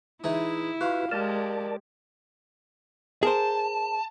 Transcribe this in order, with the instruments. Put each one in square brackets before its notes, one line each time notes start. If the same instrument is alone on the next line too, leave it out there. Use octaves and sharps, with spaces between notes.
[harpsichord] E3 G#3 D#4 [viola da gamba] E4
[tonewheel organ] F4 F#4 B4 [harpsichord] F5
[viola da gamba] G#3 G4 [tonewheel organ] A#4 D5 A5
[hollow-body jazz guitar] G#4 A#4 C5 [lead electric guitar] A5